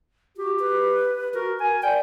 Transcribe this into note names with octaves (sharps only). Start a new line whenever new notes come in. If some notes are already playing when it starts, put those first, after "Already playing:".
F#4 G4
B4
F#4 A#4
A#4 G#5
D5 G5